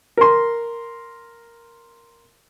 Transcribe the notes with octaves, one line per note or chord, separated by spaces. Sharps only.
A#4 C6